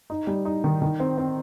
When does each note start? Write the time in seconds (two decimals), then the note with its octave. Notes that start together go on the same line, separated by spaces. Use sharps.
0.10 D#4
0.27 G3
0.45 D#4
0.64 D#3
0.82 D#3
1.00 C4
1.18 C4